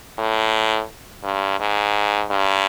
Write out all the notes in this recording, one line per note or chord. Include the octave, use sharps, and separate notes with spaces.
A2
G2
G#2
G2